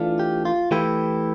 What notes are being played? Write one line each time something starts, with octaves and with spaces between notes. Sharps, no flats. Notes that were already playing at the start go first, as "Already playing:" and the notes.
Already playing: E3 A3 D4 F4
G4
F4
E3 A3 E4 G4